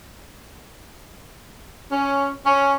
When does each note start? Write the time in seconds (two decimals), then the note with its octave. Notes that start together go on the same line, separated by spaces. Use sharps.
1.92 C#4
2.46 C#4